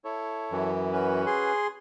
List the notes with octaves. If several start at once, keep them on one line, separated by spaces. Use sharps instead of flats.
E4 A4 C#5
F#2 E3
C#4 F#4 B4
G#4 C6